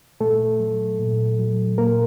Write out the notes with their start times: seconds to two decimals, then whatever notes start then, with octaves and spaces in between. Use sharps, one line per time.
0.20 A#2 A3 A4
0.60 F#3
1.00 A#2
1.39 F#3
1.78 A#2 A#3 A#4